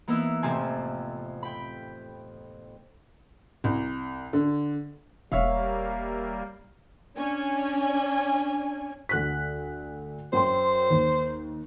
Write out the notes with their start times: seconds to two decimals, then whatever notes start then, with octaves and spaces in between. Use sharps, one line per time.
0.08 E3 A#3 B3 D#4 E4 E6
0.42 F2 A2 C3 F4 G#5 A5
1.43 G5 B5
3.64 C2
4.33 D3
5.32 E1 G3 A#3 C#5 E5 F5
7.16 C#4 D4 G#5
9.09 D2 F#6 B6
10.33 F#2 C5 G5 C6
10.90 D#2